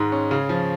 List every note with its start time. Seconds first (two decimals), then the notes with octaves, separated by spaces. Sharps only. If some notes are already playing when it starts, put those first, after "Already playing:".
Already playing: G#2 D#3 G#3
0.12 C#4
0.31 C#3
0.49 F3